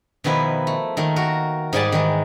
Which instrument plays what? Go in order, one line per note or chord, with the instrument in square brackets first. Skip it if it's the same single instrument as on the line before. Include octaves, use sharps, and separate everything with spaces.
[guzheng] B2 D#3 F3 E4 B4
A3
D#3 A3 A#3
F#4 A#4
G#2 G3 G#4 D5 G#5 A5
D#3 E3 G#3